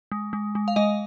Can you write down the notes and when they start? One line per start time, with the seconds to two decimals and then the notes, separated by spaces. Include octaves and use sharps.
0.12 G#3
0.33 G#3
0.55 G#3
0.68 F5
0.76 G#3 D#5